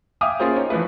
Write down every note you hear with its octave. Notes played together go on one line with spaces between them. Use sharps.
E5 F5 G5 G#5 D6 D#6
A#3 C#4 F4 G#4 A#4 C5
D#4 C#5
E3 F3 A3 B4